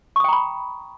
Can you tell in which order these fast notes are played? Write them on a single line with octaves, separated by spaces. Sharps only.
C#6 D#6 G5 A#5 B5